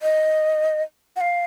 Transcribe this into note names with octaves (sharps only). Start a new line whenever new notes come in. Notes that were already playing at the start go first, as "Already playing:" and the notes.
D#5
F#5
F5